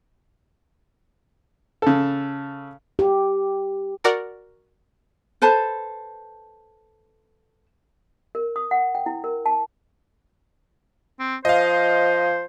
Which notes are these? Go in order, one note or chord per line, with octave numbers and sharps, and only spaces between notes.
C#3 A4
G4
F#4 A#4 D5 F#5
A4 B4 C5 A5
A#4
D#6
F#5
G5
E4
A#4
A5
C4
F3 C5 D#5 F5